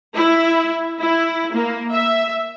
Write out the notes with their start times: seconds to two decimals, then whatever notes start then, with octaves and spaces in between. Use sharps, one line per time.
0.14 E4
0.99 E4
1.53 A#3
1.92 E5